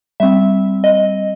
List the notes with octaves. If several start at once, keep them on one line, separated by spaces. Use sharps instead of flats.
G3 C4 E5
D#5